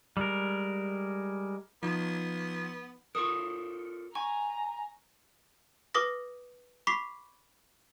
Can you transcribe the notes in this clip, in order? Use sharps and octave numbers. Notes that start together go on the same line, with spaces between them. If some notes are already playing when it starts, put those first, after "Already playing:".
G3 G#3 A#4
F3 B3 D#4
F4 A4 A#4 C#6 D#6
G#5 A#5 C#6
B4 D6 D#6 A#6
B5 C#6 D6 B6 C7